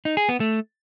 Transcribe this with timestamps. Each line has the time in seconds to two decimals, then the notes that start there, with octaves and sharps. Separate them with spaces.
0.05 D#4
0.17 G#4
0.29 B3
0.40 A3